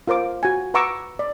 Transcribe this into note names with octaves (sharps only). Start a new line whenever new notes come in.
F4 A#4 C5 D6
F#4 G#5
B4 F#5 A#5 C#6 D6 E6
D5